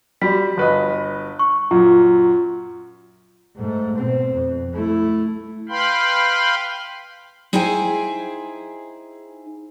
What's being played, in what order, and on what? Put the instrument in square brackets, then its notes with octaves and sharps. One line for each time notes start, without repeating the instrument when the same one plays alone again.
[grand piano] G3 [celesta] F#4 B6
[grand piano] G1 B4 D#5
[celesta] C#6
[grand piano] F#2 A#2 [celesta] F4
[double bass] G#2 A3
B2 C4
F2
A3 E4
[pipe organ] B4 F5 G5 B5 C6
[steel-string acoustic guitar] D#4 E4 G#4 C5 G5 G#5